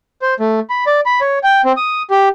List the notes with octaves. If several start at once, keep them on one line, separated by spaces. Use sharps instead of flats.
C5
A3
B5
D5
B5
C#5
G5
C4
D#6
G4